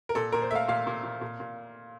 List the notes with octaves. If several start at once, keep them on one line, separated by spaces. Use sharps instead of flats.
A#4
A#2 A4
A#2 A#4
C5
A3 E5
F5
A#2 F5
A#2
A#2
A#2
A#2